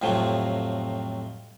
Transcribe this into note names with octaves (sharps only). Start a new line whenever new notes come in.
F2 A2 C3 F3 F#3